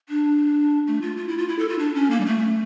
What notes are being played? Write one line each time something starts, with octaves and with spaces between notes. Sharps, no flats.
D4
A3
F4
F4
E4
F4
E4
A4
F4
D4
C#4
A#3
G3
A3